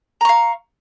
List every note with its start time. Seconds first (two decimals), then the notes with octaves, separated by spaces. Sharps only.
0.21 A#5
0.25 C#6
0.29 F5